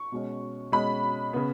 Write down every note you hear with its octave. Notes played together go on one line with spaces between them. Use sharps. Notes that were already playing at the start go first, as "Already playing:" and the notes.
Already playing: C#6
B2 G#3 C#4
B2 G#3 C#4 B5
C#3 B3